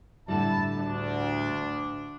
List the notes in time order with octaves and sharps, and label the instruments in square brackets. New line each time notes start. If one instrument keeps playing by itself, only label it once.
[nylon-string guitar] A2 D3 G3 [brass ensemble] E4 A5
[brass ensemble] D2 D4